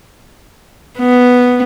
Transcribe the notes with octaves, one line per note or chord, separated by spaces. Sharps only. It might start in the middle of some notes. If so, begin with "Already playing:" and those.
B3